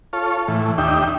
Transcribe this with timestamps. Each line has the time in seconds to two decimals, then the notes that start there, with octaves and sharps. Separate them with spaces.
0.13 F4 A4 C#5
0.48 A2 E3
0.78 D#2 D4 D#4 G4 E5 G5